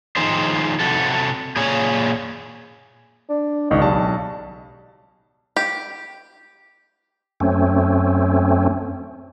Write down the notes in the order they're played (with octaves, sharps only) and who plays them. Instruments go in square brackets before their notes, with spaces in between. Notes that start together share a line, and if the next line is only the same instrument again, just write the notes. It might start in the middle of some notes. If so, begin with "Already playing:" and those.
[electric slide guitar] D#3 F3 D#4 G#4 C5
C3 F#4 A4
A#2 G#4 C#5
[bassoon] D4
[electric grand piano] G#1 C#2 C#6 [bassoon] D#4
[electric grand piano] B1 A5 [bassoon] G3
[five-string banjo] G4
[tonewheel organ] F#2 A3 C4 C#4